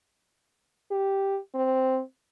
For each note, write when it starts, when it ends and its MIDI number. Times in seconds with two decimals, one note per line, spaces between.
0.91 1.39 67
1.55 2.00 60